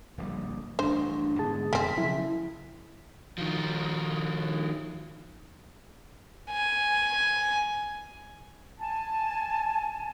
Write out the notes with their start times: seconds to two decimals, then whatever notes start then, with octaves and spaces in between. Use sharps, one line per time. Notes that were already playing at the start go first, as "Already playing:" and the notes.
0.18 D1 A#1 G3
0.79 A1 G2 D4 C5
1.39 G#2 D3 B3 G#4 A5
1.73 F2 B2 G#3 A3 C4 B6
1.98 C#3 F3 F#3 E4
3.38 D#3 F3
6.50 G#5
8.78 G#5 A5